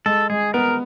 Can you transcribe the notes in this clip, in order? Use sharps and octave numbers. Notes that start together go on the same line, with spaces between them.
G#3 A4
G#3 G#4
B3 A#4